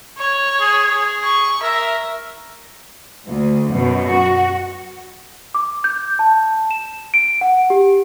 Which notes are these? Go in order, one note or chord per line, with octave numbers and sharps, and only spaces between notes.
C#5
G#4
G#4
C#6
A#4 E5
D2
F#2 B2
F#4
D6
G6
A5
E7
D7
F#5
G4